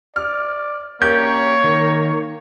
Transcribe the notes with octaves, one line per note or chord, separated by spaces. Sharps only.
D5 F6
A#3 C#4 G4 A#4 C#5 D5 G6
D#3 D#4